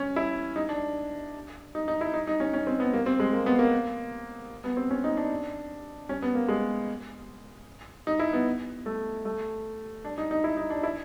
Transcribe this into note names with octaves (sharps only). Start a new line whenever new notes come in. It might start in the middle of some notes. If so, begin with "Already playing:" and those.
Already playing: C#4
E4
D#4
D4
D#4
D#4
E4
D#4
D#4
C#4
C#4
C4
B3
A#3
C4
G#3
A#3
B3
A#3
B3
C4
C#4
D#4
D4
C#4
B3
A#3
G#3
D#4
E4
B3
A3
A3
D4
D#4
D#4
E4
D#4
D4
E4